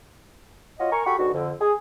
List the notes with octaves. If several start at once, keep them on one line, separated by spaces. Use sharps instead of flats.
F4 F#4 C#5 D#5
A#4 G#5 A#5 C#6
F#4 G4 A4 B5 C#6
G#2 D3 B3 F#4
F2 D3
G#4